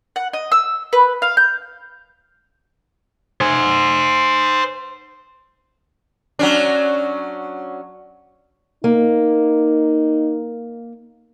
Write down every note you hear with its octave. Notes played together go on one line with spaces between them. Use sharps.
F#5
D#5
E6
B4
F5
G6
C5 G#5
F#3 C#4 D4
A#3 D#4